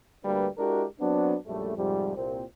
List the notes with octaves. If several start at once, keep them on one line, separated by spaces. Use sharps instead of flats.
D2 G3 A#3 D4 B4
G#3 D4 E4 F#4 G4 A#4
F#3 B3 C4 D4
A#1 F#2 G3 A3
F2 G#2 C3 F3 G3
C2 A#2 C4